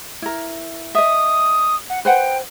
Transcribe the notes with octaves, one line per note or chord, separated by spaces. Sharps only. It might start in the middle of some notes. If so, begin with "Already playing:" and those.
E4 A#4
D#5 E5 D#6
F#5
B4 C5 F#5 G5